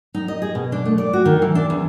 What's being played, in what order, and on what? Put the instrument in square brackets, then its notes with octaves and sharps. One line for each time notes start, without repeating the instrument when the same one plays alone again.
[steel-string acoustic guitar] D#4
D#5
G#4
B2
D4
A3
D5
F#4
D#3
E3
D4
E2